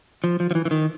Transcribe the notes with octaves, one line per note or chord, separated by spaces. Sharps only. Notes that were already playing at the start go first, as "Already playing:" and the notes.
F3
F3
F3
E3
E3
D#3